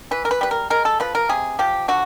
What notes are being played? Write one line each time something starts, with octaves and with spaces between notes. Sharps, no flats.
E3 B4
A#4
B4
G3 B4
A#4
G#3 A#4
A4
F3 B4
A#4
C3 G#4
F3 G4
D3 F#4